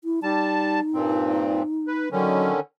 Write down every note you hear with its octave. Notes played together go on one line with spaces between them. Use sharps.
E4
G3 D#4 A5
G2 A#2 C4
B4
D3 D#3 F#3 C#4